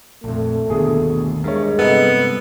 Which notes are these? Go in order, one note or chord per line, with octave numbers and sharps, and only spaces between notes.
A#1 F2 A3
G1 D#2 B2 D3 G#4 A4
G2 G#3 A#4 C#5
G2 C3 B3 A4 D#5